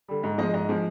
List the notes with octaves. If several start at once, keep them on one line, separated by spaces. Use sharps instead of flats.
D3 G3
G#2
F3 G#3 D#5
G#2 D#5
F3 G#3